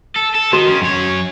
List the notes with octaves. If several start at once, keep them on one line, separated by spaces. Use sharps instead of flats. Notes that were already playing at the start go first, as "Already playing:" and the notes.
A4
A4
D#3 F#4
C#3
F#2 C#5